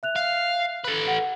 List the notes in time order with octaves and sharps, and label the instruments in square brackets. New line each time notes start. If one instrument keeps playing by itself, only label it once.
[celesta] E5 F#6 F7
[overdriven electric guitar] F5
A4 B4
[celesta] F#5